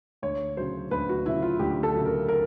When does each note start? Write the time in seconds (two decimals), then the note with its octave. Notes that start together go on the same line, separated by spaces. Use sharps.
0.22 D2 C#5
0.57 C#3 F#3 C5
0.91 D2 B4
1.09 F#4
1.26 C#3 F#3 E4
1.42 F4
1.59 D2 G4
1.83 A4
1.94 C#3 F#3
2.05 A#4
2.29 A#4